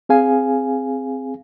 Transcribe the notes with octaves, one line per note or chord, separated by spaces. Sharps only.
C4 G#4 F5 G#5